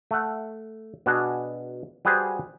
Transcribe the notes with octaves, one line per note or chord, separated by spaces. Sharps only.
A3 F#5
B2 D4 F#4 G#4
G3 F#4 G#4 B4 C5 A5